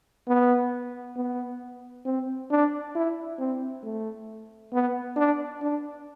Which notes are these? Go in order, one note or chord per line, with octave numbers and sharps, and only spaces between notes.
B3
B3
C4
D4
E4
C4
A3
B3
D4
D4